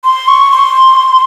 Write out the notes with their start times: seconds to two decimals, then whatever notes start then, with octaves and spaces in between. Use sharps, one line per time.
0.04 C6
0.28 C#6
0.51 C6